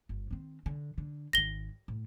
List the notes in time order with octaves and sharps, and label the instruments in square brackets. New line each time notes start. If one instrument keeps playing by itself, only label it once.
[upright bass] G1
D#3 C4
D3
D3
[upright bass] G#1 D#3 [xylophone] A#6 G7
[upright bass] A2